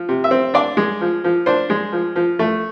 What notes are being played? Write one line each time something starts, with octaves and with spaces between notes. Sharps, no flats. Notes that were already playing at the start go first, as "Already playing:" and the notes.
Already playing: F3
C3
E5
C4
D4 D5
G#3
F3
F3
D4 C5
G#3
F3
F3
A3